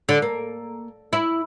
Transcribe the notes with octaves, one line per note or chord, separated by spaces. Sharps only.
D3
A#3
E4